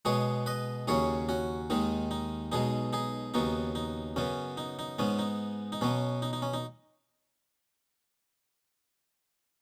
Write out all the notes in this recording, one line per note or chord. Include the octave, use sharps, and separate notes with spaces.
B2 G#3 B3 G#4 C#5
B4 D#5
D#2 C#3 F#3 C#4 G#4 C#5
C#4 F#4
D#2 D#3 G#3 D#4
D#4
B1 B2 G#3 D#4 G#4
D#4 G#4
D#2 C#3 F#3 B3 D#4
D#4
F#2 C#3 B3 C#4
D#4
D#4
G#2 G#3 B3 C#4
D#4
D#4
B2 F#3 B3 C#4
D#4
D#4
C#4
D#4